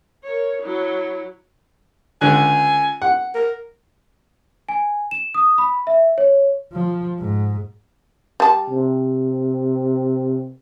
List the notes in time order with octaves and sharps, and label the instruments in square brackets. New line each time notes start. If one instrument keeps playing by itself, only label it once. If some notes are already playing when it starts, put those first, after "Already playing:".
[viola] A#4 C#5
F#3 E4
[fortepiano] C#2 D3 F#6 [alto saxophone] G#5
[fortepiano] F#5
[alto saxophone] A#4
[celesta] G#5
E7
D#6
B5
E5
C#5
[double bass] F3
G#2
[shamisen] G3 A5
[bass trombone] C3